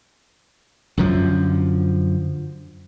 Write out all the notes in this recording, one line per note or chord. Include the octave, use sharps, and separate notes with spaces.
F#2 D3 F3